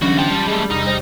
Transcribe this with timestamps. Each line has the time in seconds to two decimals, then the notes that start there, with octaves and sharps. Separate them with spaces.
0.02 D3 E3 F#3 G3 C#4 F#4
0.18 F4 G5 A5
0.30 G3
0.48 G#3 A3 G#4
0.70 E2 C3 D#4 F6
0.82 C5 E6